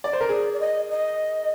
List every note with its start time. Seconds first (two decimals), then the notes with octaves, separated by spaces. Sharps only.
0.04 D5
0.13 C5
0.21 A#4
0.29 G#4 D5
0.53 D5
0.60 D#5
0.90 D#5